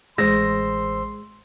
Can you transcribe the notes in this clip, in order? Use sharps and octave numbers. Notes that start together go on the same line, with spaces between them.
A1 G#3 C5 C6 E6 A#6